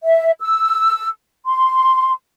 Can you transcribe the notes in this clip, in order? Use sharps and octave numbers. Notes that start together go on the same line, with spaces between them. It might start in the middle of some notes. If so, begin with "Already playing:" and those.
E5
E6
C6